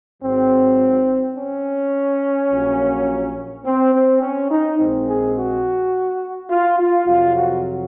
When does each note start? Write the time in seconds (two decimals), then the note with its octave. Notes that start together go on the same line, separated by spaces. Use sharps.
0.22 G#1 G#2 F#3 C4
1.37 C#4
2.51 A#1 A#2 F#3 A#3
3.65 C4
3.94 C4
4.22 C#4
4.51 D#4
4.79 A#1 A#2 G#3 C4
5.07 G#4
5.36 F#4
6.51 F4
6.79 F4
7.07 F2 C3 F#3 F4
7.36 F#4